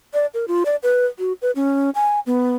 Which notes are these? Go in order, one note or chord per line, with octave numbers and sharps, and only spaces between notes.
D5
A#4
F4
D5
B4
F#4
B4
C#4
G#5
B3